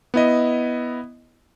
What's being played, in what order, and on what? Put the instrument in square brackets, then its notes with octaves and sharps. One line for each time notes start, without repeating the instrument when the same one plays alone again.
[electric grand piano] B3 E4 D#5